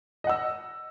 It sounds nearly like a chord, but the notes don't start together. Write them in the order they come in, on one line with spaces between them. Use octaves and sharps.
D#5 F#5 E6